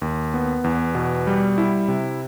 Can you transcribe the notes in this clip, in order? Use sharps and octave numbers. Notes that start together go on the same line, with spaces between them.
D#2
B3
E2
B2
G3
E4
C3